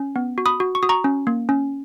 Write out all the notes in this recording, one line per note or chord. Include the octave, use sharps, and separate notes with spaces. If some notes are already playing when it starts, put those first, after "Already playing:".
Already playing: C#4
B3
F#4
B5 D#6
F#4
C#6
F#4 D#6
A#5 C#6
C#4
A#3
C#4